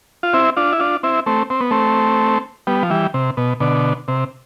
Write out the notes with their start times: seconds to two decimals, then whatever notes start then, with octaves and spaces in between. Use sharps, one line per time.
0.23 F4
0.33 C4 E4
0.57 D4 F4
0.72 E4
0.80 D4 F4
1.03 C4 E4
1.26 A3 C4
1.50 C4
1.61 B3
1.71 A3 C4
2.67 G3 B3
2.83 F3
2.90 E3 G3
3.14 C3
3.37 B2
3.60 B2 D3
4.08 C3